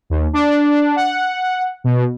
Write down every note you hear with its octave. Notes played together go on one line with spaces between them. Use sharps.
D#2
D4
F#5
B2